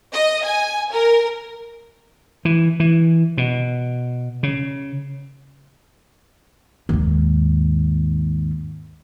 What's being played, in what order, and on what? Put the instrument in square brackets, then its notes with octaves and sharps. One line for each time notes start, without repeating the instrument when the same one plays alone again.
[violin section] D#5
G#5
A#4
[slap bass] E3
E3
B2
C#3
[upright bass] D#2 G#2